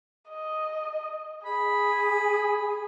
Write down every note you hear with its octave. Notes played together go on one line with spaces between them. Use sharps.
D#5
G#4 B5